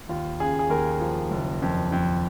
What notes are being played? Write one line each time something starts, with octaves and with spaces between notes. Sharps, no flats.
D#2 F4
C#3 G#4
G#4
D#2 A#4
F3
F#1
F2
F2